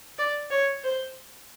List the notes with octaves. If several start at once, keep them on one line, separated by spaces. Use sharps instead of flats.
D5
C#5
C5